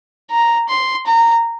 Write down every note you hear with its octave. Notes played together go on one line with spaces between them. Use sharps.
A#5
C6
A#5